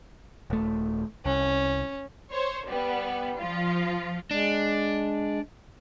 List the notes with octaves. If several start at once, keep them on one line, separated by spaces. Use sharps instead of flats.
D#1 A3
C2 C#4
C5 C#5
G3 B3
F3 F4
G#3 D4